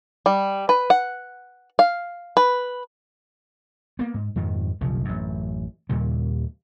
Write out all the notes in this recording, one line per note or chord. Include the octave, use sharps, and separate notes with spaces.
G3
B4
F#5
F5
B4
A#3 B3
G#2
F2 G#2 D#3
F1 B1 C#3 F3
A1 F#2
D#2 A#2 C#3 G3